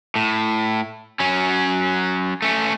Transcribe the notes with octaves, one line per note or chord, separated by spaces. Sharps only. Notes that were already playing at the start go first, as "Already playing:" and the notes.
A2
F#3 C#4
A3 C#4